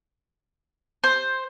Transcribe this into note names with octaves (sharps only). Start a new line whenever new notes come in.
C5